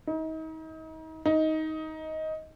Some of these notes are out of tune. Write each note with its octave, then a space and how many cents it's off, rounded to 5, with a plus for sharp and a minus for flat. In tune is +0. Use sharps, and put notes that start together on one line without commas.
D#4 +35
D#4 +15